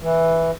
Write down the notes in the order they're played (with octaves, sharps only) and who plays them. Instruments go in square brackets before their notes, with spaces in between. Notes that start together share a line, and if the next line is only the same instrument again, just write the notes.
[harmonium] E3